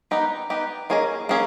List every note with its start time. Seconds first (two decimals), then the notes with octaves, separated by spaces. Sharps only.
0.11 B3 D#4 G4
0.50 B3 D#4 G4
0.90 A#3 C#4 G#4 D#5
1.29 A#3 C#4 G#4